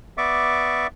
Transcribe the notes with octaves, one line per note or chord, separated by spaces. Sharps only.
B3 D5 E5 C#6 D6